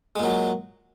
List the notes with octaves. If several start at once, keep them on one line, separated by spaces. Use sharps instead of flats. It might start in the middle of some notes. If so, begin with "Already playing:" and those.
A#2 F#3 G#3